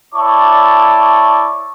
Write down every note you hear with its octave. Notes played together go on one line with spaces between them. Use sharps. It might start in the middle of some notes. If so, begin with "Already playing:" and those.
E4 C#5 D5 A5 C#6 D6